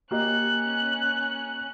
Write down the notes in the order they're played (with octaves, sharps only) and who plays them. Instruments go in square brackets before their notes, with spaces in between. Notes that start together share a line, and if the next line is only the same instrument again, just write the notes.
[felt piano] A#3 G4 D#5 [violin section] C#4 F#6